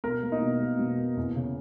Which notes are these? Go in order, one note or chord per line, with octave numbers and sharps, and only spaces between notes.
B2 A#4
A#3
D#4
B2
A#3
B2
A#3
E2
C#3